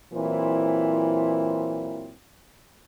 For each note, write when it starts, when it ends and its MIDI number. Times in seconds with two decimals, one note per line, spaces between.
0.13 2.12 46
0.13 2.12 52
0.13 2.12 54
0.13 2.12 60
0.13 2.12 64
0.13 2.12 72